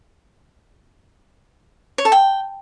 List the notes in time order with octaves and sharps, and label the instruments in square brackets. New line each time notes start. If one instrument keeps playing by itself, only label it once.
[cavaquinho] C#5
A4
G5